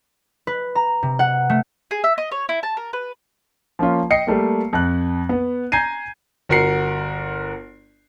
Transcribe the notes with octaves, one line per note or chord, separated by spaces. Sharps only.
B4
A#5
C3
F#5
A3
G#4
E5
D#5
C#5
E4
A5
A#4
B4
F3 A#3 C#4 F4
D#5 G5 C7 C#7
G3 A3 A#3
F2 F#6
B3
G#5 A#5 G6 G#6 C7 D#7
G1 F#4 A#4 F#5 C7